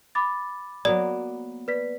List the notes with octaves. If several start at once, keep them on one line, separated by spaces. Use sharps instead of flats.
B5 D6 A6
F#3 A#3 B3 D5
B4 D5 B6